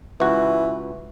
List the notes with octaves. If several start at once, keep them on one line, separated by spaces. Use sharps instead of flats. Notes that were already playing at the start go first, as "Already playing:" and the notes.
C#2 E3 F#4